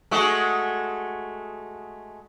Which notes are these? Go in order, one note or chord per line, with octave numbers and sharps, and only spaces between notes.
G#3 A3 F#4